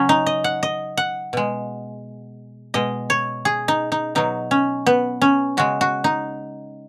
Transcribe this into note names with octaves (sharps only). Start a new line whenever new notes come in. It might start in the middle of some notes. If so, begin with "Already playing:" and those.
Already playing: C#3 F#3 C#4
D#4
D#5
F#5
D#5
F#5
B2 G#3
B2 G#3 D#5
C#5
G#4
D#4
D#4
B2 F#3 D#4
C#4
B3
C#4
C#3 G#3 F#4
F#4
D#4